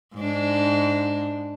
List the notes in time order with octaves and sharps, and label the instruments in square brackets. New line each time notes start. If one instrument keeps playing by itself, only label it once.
[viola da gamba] G#2 D4